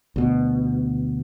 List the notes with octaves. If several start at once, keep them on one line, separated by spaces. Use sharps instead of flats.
D2 B2